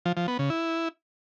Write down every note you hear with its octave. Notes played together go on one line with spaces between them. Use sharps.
F3
F3
B3
C#3
E4